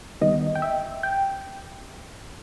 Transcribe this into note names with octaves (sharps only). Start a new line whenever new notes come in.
D#2 D#3 G3 B3 D#5
G5
E5
G5